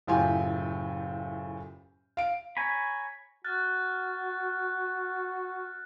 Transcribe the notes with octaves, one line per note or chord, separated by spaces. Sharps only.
F#1 A2 F4 G4 G5 G#5
F5 D7
C#5 G#5 A#5 B5
F#4 F6 F#6 A6